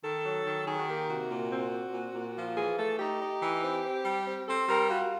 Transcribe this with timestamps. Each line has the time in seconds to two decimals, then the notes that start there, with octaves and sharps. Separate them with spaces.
0.04 D#3 A4
0.25 F#3
0.47 D#3
0.68 D#3 G#4
0.78 F#4
0.89 A#3 G4
1.10 C3 F#4
1.31 A#2
1.52 C4
1.73 C4
1.94 A#2
2.15 A#2
2.37 F3
2.57 E3 G#4
2.78 A3 A4
2.99 D#4 G4
3.21 D#4
3.43 E3
3.64 C4
3.85 C4
4.05 G3
4.27 C4
4.48 C4 A4
4.69 G3 A#4
4.90 F4 F#4